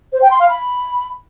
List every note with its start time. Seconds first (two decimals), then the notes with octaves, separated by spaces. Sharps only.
0.12 C5
0.21 G5
0.30 C6
0.39 F5
0.48 B5